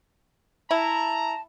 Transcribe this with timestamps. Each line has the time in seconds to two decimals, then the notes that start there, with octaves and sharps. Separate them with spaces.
0.71 E4 A5 A#5